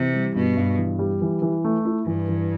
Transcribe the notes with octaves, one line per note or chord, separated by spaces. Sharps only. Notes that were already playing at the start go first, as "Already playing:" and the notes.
Already playing: C3 E3
G3
G2 B2
G2
E3
G3
E3
E3
A3
E4
G2 E3
E3